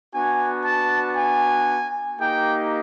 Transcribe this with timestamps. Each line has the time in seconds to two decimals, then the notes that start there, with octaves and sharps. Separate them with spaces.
0.14 B3 D4 F#4 G#5
0.65 A5
1.16 G#5
2.20 A#3 D#4 G4 G5